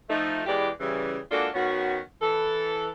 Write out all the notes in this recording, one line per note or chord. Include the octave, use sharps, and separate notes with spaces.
F3 A3 D#4
E2 E3 G#3 G4 D5
C#3 E3 G3
G#3 A#3 D4 F4 F#4 A4
D#3 B3 C#4 F#4
E3 A4